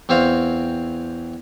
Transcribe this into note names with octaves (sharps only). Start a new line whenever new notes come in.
E2 C4 C5 C#5 F5